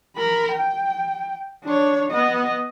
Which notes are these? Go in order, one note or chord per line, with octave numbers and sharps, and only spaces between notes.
A#4 B5
G5
D4 C#5
B3 D#5